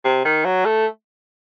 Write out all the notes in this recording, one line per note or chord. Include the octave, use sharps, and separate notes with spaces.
C3
D#3
F#3
A3